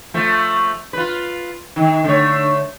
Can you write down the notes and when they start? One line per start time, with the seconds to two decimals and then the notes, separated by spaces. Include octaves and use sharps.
0.14 F3 A3
0.93 F4 B4
1.76 D#3
2.04 D3 A3 C#5